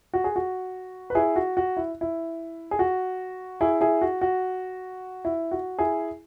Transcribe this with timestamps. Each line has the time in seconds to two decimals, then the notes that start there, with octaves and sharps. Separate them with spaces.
0.14 F#4
0.24 G#4
0.36 F#4
1.10 B4
1.15 E4 G#4
1.36 F#4
1.57 F#4
1.77 E4
2.01 E4
2.71 G#4
2.79 F#4
3.61 E4 G#4
3.81 E4 G#4
4.01 F#4
4.21 F#4
5.25 E4
5.51 F#4
5.79 E4 G#4